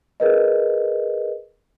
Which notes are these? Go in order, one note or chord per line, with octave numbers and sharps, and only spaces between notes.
G#4 A#4 B4 D#5